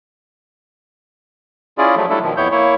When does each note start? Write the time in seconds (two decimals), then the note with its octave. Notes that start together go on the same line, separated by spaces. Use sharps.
1.78 C#4 E4 F4 G#4 D5
1.96 F3 F#3 A3
2.10 F#3 G3 A3 D4 E4 A4
2.22 B2 D#3 F3
2.37 F2 B3 E4 C#5 G6
2.52 A#3 E4 C#5